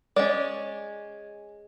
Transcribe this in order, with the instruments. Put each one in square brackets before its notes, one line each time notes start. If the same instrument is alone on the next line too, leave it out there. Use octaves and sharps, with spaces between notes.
[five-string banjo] G#3 C#4 D5